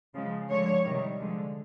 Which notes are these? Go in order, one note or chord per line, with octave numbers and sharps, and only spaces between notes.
C#3 F3 G#3
D3 F3 G#3 C#5
C3 D#3 G3
D3 F3 G#3